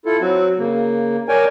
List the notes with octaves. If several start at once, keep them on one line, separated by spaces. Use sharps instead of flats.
E4 F4 A4
F#3 C4 F#4
C#3 A#3
A#4 C#5 D5 G5 G#5